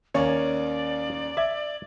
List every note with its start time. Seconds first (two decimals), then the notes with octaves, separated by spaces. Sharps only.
0.14 D#2 A#3 C#4 C#5 D5
1.37 E5 D6 G#6